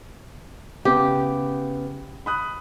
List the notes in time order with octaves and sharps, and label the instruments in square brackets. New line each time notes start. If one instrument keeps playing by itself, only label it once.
[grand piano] C#3 B3 [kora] G4
[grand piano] B5 D#6 F#6